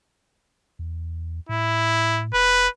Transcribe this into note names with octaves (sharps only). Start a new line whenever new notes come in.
E2
A2 E4
F1 B4